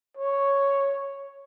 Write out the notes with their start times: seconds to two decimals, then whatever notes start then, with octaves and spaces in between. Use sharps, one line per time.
0.17 C#5